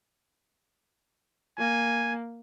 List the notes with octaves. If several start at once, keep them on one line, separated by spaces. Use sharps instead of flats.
A#3 G#5